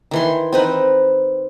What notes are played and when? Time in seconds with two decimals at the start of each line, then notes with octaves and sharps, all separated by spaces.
0.11 D#3 E3 C6
0.53 C4 D#4 B4